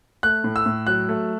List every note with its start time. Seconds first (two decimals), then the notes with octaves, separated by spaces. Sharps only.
0.23 A3 F#6
0.44 A2
0.56 E6
0.66 A2
0.87 F#3 F#6
1.09 A3